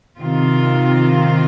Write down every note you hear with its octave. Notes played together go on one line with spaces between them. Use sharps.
C3 D#3 C4 F4